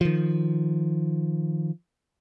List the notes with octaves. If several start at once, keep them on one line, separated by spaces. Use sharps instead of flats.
D#3 F3